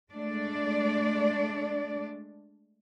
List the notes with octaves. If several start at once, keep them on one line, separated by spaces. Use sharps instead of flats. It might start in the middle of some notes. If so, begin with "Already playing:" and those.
G#3 A3 D4 D5